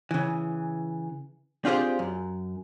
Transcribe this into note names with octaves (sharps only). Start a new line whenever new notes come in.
C#3 E3
C4 D4 F4 G4 G#4 C5
F#2